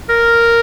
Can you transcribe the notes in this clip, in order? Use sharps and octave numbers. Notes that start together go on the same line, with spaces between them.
A#4